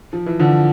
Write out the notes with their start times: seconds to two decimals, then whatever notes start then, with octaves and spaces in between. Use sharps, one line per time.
0.13 F3
0.26 E3
0.39 D3 F3